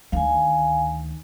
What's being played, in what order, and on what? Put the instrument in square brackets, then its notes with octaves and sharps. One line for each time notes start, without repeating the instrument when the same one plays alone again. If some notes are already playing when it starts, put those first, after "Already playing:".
[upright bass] D2 D#3 [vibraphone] F5 G#5